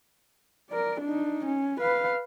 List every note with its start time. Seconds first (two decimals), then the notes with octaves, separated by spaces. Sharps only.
0.70 A#4 D5
1.01 D4 D#4
1.45 C#4
1.80 B4 F5